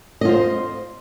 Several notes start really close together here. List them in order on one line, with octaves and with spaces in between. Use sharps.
D#5 F4 C5